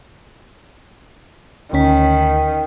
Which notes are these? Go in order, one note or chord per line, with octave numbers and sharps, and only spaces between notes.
D2 D#3 C#4 B6